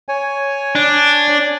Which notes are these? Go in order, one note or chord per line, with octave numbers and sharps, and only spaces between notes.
C#5 G#5
D4